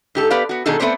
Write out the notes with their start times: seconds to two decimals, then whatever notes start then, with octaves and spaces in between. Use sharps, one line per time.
0.15 G#2 G4 A4
0.30 B3 G4 B4 D5 F5
0.49 B3 F#4
0.66 B2 D#3 D4 D#4 G#4 A4
0.80 A3 B3 C4 C5 D5